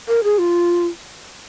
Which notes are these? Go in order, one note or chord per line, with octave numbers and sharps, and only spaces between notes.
A#4
G#4
F4